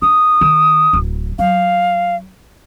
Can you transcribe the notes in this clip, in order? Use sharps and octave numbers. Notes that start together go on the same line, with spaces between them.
D4 D#6
D#3
D1
F#3 F5